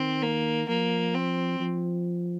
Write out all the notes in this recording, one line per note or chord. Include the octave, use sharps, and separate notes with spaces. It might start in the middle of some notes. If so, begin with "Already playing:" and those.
Already playing: D#3 C4
A#3
F3 A#3
C4
F3